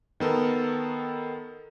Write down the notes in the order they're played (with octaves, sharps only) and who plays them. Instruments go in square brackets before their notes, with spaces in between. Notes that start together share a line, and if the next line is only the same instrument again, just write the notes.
[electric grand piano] D#3 B3 A4 A#4